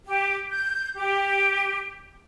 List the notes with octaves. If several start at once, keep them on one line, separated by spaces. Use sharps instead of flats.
G4
G6
G4